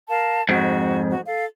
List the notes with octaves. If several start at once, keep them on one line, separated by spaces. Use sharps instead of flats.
A#4 F5 A5
F2 G#2 F#4
F#4
A4 F5